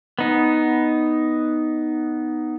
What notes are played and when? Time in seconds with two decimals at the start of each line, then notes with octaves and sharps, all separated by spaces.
0.19 B3 D#4